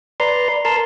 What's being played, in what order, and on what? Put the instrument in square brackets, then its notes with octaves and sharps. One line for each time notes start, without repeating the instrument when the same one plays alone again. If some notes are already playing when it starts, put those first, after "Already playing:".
[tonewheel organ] B4 D5 A#5 C6
A#4 A5 A#5 C6